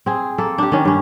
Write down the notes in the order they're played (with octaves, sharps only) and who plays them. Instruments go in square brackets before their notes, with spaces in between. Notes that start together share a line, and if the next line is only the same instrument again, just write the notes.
[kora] C4 G#4
A#3 A4
D4 G4
D#3 C#4
G2 C#4